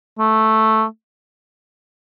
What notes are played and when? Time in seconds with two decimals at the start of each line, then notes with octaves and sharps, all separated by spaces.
0.19 A3